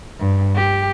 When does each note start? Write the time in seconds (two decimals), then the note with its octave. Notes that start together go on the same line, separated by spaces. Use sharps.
0.20 G2
0.56 G4